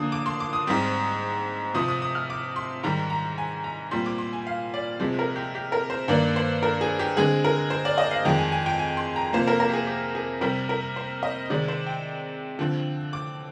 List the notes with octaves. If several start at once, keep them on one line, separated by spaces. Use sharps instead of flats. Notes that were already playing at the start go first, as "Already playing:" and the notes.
Already playing: D3 F3 A#3 D4 D#6
D6
C6
D6
D#6
G#2 G3 C4
C3 F3 C4 D#6
D#6
D#6
F6
D6
C6
G#2 D#3 G3 A#5
A#5
G#5
A#5
A#2 G3 C4 C6
D6
C6
G#5
F5
D5
C3 F3 G#3 C4
A#4
G4
G4
A#4
C5
G2 D#3 A#3 D5
C5
A#4
G#4
G4
D3 G#3 C4 G#4
A#4
C5
D5
D#5
F5
F2 D#3 G#3 G5
G#5
G#5
G5
G#5
C6
A#5
C3 F3 A#3 C5
A#4
A#4
G4
G#4
G4
G#4
C3 G3 C4 A#4
A#4
C5
D#5
C3 D#3 G#3 C4 D5
C5
G5
D3 F3 C4
D6